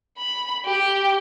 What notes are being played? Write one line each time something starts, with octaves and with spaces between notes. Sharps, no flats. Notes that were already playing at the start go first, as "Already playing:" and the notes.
B5
G4